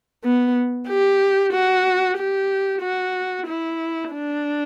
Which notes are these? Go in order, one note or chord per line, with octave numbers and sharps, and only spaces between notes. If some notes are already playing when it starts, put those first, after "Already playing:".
B3
G4
F#4
G4
F#4
E4
D4